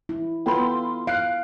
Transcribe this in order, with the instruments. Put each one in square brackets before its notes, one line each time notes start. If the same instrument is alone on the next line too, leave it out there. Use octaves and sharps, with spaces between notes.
[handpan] E4
[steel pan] B3 A4 G5 [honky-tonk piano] F4 B5 C6
[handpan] F5 [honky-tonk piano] F#6 C7 D7